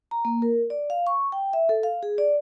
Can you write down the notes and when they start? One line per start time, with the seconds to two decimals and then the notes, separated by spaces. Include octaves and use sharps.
0.11 A#5
0.25 A#3
0.42 A#4
0.70 D5
0.90 F5
1.07 C#6
1.32 G5
1.53 E5
1.69 A4
1.83 F5
2.03 G#4
2.18 D5